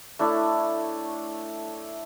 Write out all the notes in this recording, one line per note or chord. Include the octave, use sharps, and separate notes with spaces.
A3 D4 E4 C#5